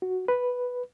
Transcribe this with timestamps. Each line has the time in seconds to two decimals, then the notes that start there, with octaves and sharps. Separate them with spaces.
0.02 F#4
0.28 B4